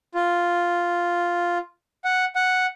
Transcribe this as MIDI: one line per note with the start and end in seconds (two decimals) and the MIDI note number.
0.15 1.58 65
2.04 2.25 78
2.36 2.66 78